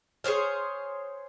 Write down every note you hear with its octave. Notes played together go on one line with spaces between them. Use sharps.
G#4 C5 C#5 F5